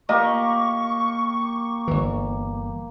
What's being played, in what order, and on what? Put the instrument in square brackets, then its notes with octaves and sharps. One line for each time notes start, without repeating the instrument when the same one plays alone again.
[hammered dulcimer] A#3 G4 [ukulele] D#5 [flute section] C#6
[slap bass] G1 E3